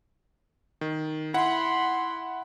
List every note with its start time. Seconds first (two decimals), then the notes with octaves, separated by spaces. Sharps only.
0.81 D#3
1.34 E4 F#5 B5 C6